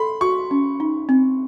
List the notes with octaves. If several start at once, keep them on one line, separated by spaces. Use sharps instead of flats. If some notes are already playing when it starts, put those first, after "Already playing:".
Already playing: A4 B5 C6
F#4 C#6
C#4
D#4
C4